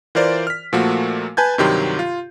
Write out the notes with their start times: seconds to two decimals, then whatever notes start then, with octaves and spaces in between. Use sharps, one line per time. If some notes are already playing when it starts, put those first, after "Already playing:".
0.15 E3 F4 A#4 C5 D5
0.47 F6 B6
0.73 A#2 F3 A3 A#3 F#4
1.37 B4 G#5 A5 G6 G#6
1.58 G2 C3 D#3 F#3 G4 C6
1.99 F4